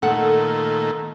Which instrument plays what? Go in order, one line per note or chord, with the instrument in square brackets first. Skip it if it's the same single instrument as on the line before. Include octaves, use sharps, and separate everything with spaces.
[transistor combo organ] A#2 D#3 A3 [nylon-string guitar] A4 F#5